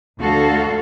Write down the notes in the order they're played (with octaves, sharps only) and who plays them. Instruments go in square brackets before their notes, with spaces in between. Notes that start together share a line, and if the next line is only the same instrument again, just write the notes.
[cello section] D2 D3 F#4 A4 F5